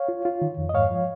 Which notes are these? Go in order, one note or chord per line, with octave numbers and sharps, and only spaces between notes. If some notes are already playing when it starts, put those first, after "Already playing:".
Already playing: C#5 F5
F4
F4
D#3
F2
D#5
G#2 C#5 F5
F3